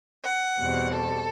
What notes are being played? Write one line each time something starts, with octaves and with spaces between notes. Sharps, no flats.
F#5
E2 B2 G3 C4
A4